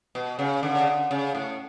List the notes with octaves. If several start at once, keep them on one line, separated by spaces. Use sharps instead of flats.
B2
C#3
D3
C#3
D3
C#3
A2